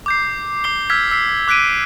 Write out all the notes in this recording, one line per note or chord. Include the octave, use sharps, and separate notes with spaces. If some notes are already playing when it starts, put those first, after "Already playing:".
D6 G6 C7
D6 C7 G7
E6 F6 G6 G#6 B6
E6 B6 C7
D6 F#6 B6 D7 D#7